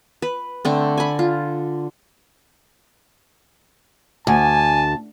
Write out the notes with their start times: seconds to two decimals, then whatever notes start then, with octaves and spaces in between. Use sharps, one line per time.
0.22 B4
0.65 D3 A3 C4
0.98 G#5 B5
1.19 F4
4.27 D2 G#5 A5